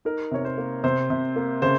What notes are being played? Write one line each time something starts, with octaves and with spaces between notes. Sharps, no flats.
D#4 A#4
C3 C#5
C5
A#3
C3 C5
C3
A#3
C#3 C5